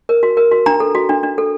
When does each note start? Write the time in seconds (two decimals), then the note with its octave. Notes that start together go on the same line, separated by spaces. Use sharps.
0.09 A#4
0.23 F#4
0.37 A#4
0.51 F#4
0.66 D4 A#5
0.80 A4
0.95 F#4
1.09 D4
1.23 D4
1.38 A4